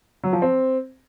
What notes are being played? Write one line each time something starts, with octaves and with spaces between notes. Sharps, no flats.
F#3
F3
C4